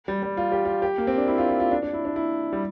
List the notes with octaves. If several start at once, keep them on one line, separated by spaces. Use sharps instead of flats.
G3
G3
F4
G4
F4
G4
A#3
C4
D4
E4
F4
F4
F4
D4
D4
E4
D4
E4
G3